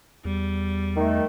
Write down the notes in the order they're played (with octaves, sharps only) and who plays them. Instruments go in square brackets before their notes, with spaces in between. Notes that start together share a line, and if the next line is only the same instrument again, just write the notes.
[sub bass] E2 [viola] G3
[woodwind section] D#3 A3